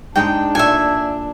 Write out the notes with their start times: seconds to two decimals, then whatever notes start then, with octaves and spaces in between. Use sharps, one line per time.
0.16 G#2 G#3 D4 D#4 G5
0.55 A#2 A4 C#5 E5 G#5